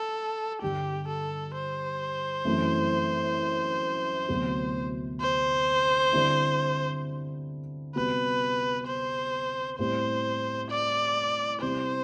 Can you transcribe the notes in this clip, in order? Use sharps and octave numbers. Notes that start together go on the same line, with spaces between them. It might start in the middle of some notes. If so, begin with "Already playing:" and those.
Already playing: A4
G2 D3 G3 G4
A4
C5
F#2 E3 A3 C4
D2 C3 F#3 B3 F#4
C5
D3 G3 C4 E4
C3 G3 B3 F#4 B4
C5
A2 G3 C4 C5
D5
C3 G3 C4 E4 C5